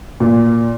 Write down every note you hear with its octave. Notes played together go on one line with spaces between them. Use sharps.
A#2